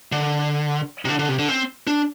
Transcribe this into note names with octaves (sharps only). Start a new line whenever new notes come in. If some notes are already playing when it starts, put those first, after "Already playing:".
D3
C3
D3
D3
C3
D3
C4
D4